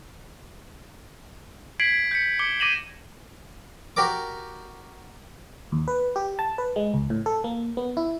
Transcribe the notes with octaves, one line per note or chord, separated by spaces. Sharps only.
G#6 B6 C7 D7 F#7
G6 B6 C#7
D6 C#7 G7
D6 A#6 D#7 E7 F#7
F#4 G4 A#4 D5 D6
D#2
B4
G4
A5
B4
G#3
C#2
A2
A4
A#3
B3
E4